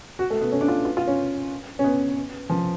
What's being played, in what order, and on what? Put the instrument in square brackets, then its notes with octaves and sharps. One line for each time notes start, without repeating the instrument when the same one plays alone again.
[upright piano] F#4
A3
B3
C#4
D4
F4
F4
F4
C#4
C#4
B3
F3